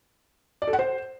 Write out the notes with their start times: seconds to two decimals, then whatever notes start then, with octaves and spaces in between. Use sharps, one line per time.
0.62 D5
0.67 A4
0.73 F#5
0.79 C5